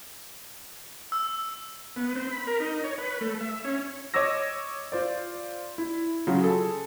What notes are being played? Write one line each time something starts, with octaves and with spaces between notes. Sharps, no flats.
E6
B3
C4
B5
A#4
D#4
C#5
B4
A3
E5
C#4
C#5 D#5 D6 E6 A#6
F4 C5 D5
E4
C#3 F#3 F4 F#4
G#4 A4